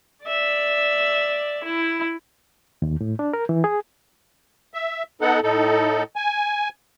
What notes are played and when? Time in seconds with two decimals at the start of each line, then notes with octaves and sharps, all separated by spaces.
0.25 D5 E5
1.65 E4
2.82 D#2
3.01 A2
3.19 D4
3.33 A#4
3.49 E3
3.64 G#4
4.74 E5
5.21 B3 D#4 A4 F#5
5.43 A2 D#4 A4
6.16 G#5